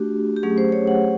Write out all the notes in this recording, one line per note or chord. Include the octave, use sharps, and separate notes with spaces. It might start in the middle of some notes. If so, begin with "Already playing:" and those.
Already playing: A3 D4 F#4 G4
G4
F#3 A3 C#4 G#4
C5
C#5
F#5